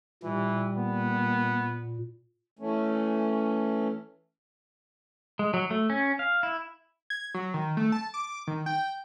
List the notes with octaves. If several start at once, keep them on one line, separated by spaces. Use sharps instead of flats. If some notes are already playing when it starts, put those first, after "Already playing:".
A#2 E3 G3
A#3 B3
E3 A3 C#4
G#3
F#3
A3
C#4
F5
E4
G#6
F#3
D#3
A3
A5
D6
D#3
G5